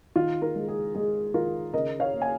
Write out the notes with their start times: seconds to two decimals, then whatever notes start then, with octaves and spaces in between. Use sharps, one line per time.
0.16 D#3 F4
0.42 F4 A#4
0.55 G#3
0.68 G#4
0.95 G#3 G#4
1.34 D#3 F4 A#4
1.73 C#3 A#4 D#5
2.00 C#5 F5
2.13 A#3
2.22 G#5